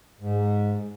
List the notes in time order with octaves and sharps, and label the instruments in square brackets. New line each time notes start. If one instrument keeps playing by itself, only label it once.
[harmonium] G#2